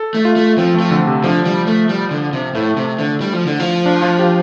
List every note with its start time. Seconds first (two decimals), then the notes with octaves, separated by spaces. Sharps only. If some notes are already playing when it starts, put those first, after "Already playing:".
Already playing: A4
0.14 A3
0.25 F4
0.36 A3
0.58 F3 C4
0.74 A3
0.80 F3
0.91 D3
1.07 C3
1.24 D3 F3
1.46 G3
1.67 A3
1.89 G3
2.11 D3
2.33 C3
2.55 A2 A3
2.77 C3
2.99 D3
3.21 G3
3.33 F3
3.46 D3
3.59 F3
3.86 D4
4.02 F4
4.19 G4